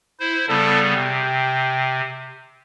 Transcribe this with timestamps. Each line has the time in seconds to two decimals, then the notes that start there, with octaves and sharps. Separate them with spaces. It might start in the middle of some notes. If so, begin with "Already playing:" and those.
0.20 E4 C5
0.49 C#3 G3 B3 A4
0.95 C3 G5